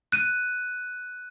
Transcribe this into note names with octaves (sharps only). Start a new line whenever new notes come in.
F#6 D#7